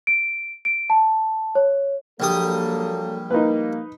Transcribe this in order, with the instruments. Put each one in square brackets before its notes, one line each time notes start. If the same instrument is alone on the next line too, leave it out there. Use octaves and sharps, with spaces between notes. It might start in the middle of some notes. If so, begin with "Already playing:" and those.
[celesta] D7
D7
A5
C#5
[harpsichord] A#1 G3 D#6 [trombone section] F#3 A#3 A4
[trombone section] A#3 [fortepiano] D#4 B4